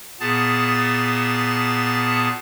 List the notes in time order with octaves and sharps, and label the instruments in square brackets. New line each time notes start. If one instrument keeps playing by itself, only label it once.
[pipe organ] A#2 B3 G#4 A5 A6